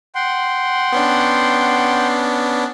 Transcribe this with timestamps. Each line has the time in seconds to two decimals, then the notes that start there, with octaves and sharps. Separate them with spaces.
0.15 F#5 G5 C6
0.92 B3 C#4 D4